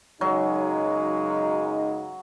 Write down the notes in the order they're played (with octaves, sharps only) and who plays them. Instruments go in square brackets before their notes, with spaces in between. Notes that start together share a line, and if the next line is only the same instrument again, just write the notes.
[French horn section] F#2 C#3 G#3 D#4 [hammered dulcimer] F#3